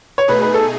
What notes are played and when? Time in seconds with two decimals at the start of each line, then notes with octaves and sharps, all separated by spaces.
0.18 C#5
0.28 B2 A3 D#4 G#4 B4
0.42 B4
0.54 A4